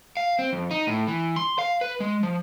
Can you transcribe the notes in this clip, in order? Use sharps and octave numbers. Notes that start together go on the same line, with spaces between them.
F5
C4
F2
D#4
A2
E3
C6
F5
B4
G#3
F3